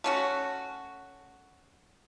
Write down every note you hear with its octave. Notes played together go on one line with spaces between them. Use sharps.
A3 C#4 F#4